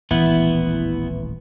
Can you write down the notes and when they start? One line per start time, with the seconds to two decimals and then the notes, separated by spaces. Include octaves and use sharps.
0.11 D#1 A1 E3 B3 E4